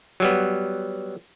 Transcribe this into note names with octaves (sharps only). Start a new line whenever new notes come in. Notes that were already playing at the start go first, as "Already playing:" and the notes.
F#3 G3 B3